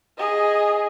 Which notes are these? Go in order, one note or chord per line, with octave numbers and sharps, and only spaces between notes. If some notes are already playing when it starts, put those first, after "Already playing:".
G#4 D#5